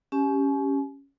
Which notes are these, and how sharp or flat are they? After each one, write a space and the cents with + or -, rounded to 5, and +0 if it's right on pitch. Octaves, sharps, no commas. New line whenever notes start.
C#4 +0 G4 +0 G#5 +40